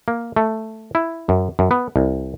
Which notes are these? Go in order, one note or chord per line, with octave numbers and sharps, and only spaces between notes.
A#3
A3
E4
F#2
F#2
B3
C2